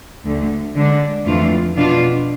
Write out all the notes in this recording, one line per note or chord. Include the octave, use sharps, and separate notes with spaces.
D2 D3 A3
D3 G#3 D4
F2 E3 A3 D4 F4
B2 B3 D4 F4